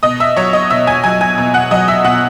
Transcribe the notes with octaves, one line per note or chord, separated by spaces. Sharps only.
B2 D#5 D#6
E5 E6
F#3 C#5 C#6
D#5 D#6
B2 E5 E6
G#5 G#6
F#3 G#5 G#6
G#5 G#6
B2
F#5 F#6
F#3 D#5 D#6
E5 E6
B2 F#5 F#6